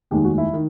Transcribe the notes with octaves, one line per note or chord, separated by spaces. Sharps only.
F1 D#2 D#3 G#3 G4
F#4
E4
D#3